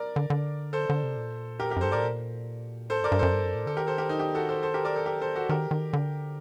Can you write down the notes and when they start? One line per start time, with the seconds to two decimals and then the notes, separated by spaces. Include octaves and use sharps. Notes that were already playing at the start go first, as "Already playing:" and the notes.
Already playing: A#4 D5
0.16 D3
0.30 D3
0.73 A4 C5
0.89 D3
1.03 C3
1.17 A#2
1.60 G4 A#4
1.70 G4 A#4
1.76 F#2
1.81 G2 A4 C5
1.92 A2 A#4 D5
2.04 A#2
2.89 A2 A4 C5
3.01 G2
3.04 A#4 D5
3.12 G2
3.19 F#2 A4 C5
3.33 G2
3.43 F#2
3.55 A2
3.66 D3 A4
3.76 D#3 G4 A#4
3.87 A4 C5
3.98 G4 A#4
4.09 D#4
4.19 D#4 G4
4.35 F#4 A4
4.49 A4 C5
4.63 A4 C5
4.74 G4 A#4
4.85 A#4 D5
4.95 A4 C5
5.06 G4 A#4
5.22 A4 C5
5.36 F#4 A4
5.49 D#3 G4 A#4
5.71 D#3
5.93 D3